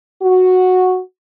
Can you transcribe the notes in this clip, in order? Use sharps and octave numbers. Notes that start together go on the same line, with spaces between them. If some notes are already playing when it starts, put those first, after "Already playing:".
F#4